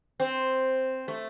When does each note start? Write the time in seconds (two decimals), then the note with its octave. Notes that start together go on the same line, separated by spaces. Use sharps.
0.20 C4
1.08 A3